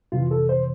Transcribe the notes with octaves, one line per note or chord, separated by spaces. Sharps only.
F2 C3 E3 F4
A4
C5